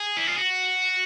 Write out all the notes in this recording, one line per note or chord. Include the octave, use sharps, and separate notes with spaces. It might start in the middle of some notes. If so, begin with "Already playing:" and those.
Already playing: G#4
E4
F4
F#4